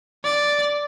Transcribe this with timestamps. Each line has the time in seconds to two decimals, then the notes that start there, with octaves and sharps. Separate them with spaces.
0.24 D5